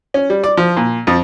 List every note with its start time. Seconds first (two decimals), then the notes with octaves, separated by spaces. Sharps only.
0.14 C#4
0.30 G3
0.44 D5
0.57 F3
0.77 A#2
1.07 F2